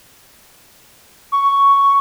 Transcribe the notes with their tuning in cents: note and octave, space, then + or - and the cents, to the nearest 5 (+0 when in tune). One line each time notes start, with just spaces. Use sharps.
C#6 +5